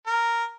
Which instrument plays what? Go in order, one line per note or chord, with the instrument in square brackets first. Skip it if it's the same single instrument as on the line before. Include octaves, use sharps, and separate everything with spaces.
[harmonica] A#4